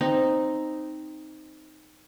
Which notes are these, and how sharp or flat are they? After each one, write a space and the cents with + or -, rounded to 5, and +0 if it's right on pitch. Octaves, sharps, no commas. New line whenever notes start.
C4 +0 D#4 -5